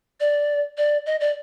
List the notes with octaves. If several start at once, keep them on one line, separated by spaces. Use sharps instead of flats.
D5
D5
D#5
D5